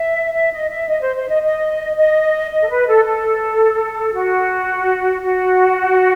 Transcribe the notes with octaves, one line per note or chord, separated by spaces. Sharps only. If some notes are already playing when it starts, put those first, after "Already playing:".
Already playing: E5
E5
D#5
E5
D#5
C5
C5
D#5
D#5
D#5
D#5
A4
B4
A4
A4
F#4
F#4